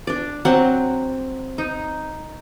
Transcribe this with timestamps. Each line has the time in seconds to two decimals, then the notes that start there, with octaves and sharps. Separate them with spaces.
0.07 D4 D5
0.45 F#3 C4 F#5
1.58 D#4